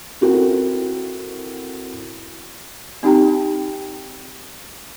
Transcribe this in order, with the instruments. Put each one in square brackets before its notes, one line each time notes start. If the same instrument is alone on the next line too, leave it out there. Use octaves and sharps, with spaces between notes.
[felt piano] C4 E4 F#4 A4 A#4
[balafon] C4 D#4 G4 G5 A#5